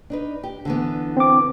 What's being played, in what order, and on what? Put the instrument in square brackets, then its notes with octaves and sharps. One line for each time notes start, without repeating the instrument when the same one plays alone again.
[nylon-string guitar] D4 D#4 B4
G4
D3 E3 B3
[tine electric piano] C4 D6